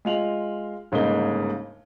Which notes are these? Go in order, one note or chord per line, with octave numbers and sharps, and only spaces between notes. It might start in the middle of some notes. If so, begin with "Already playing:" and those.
G#3 F4 F7 F#7
G1 G#2 C#3 A#3 D#5 G7